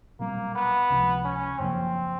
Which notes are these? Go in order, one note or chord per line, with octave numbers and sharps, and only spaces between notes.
B1 A#2 G3 A#3 C4
B3
C#2 C3 F3
C#4
F#2 C#3 F3 A#3 C4